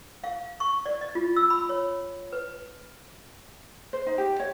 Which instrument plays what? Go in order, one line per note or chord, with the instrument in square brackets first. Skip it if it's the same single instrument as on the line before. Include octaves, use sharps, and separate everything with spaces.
[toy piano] F5
C#6
D5
D#5
F4
E6
B5
C#5
B4
[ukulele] C5
D#4
G4
C#5